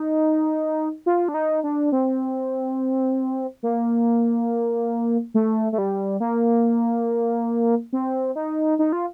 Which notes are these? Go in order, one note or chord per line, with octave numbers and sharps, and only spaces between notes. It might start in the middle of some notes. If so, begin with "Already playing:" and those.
Already playing: D#4
F4
D4
D#4
D4
C4
A#3
A3
A3
G3
A#3
C4
D#4
D#4
F4